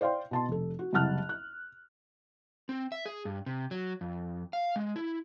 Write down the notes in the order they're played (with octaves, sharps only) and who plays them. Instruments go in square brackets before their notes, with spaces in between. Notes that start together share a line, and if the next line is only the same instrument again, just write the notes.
[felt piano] C5 D5 F5 G5 C6
B2 A5 C6
F1 A4
F#4
F#1 C2 F#5 A5 F6 F#6
F#6
[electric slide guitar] C4
E5
G#4
G2
C3
F#3
F2
F5
G#3
E4